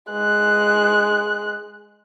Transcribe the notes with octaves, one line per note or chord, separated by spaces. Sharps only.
G#3 F#6